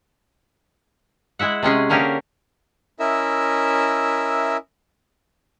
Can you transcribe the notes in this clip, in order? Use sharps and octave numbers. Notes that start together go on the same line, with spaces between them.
G#3 E4 E5 F#5
C3 G#3 C#4 G#4
D3 A#3 C#4 G4 G#4 A#4
C#4 E4 A#4 D#5 E5 E6